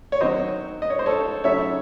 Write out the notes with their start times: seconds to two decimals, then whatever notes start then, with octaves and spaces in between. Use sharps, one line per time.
0.12 C#5
0.21 D#3 F#3 C4 D#4 C5 D#5
0.82 D#5
0.90 C#5
0.99 C5
1.06 A4 C#5
1.44 C#3 F#3 A3 D#4 C#5 E5